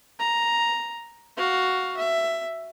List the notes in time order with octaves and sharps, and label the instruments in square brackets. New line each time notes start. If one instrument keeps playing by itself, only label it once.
[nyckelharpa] A#5
F#4 F5
E5